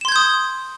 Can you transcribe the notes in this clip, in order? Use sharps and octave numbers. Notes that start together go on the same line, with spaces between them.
C6 D#6 G6 G#6 E7